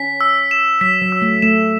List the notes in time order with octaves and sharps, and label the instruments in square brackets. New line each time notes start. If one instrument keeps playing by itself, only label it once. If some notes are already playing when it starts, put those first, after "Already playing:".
Already playing: [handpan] C#4 [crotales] B6
[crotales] E6
E7
[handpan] F#3 [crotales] B6
[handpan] F#3
[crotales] E6
[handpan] A3
[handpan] A3 [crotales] E7